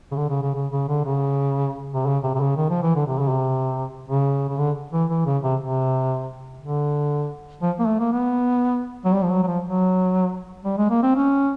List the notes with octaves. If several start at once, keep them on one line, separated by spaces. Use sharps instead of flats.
C#3
D3
C#3
C#3
C#3
C#3
D3
C#3
C3
C#3
C3
C3
C#3
D#3
F3
E3
D3
C3
C#3
C3
C#3
C#3
D3
E3
E3
C#3
C3
C3
D3
F3
A#3
A3
A#3
B3
F#3
G3
F3
F#3
F#3
F3
F#3
G3
G#3
A#3
C4
C#4